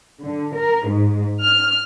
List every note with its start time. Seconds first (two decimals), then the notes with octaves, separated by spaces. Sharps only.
0.24 D3
0.56 A#4
0.88 G#2
1.42 F6